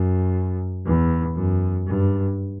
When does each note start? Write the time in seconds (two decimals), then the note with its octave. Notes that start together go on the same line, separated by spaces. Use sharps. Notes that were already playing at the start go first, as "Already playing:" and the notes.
Already playing: F#2
0.86 E2
1.36 F#2
1.86 G2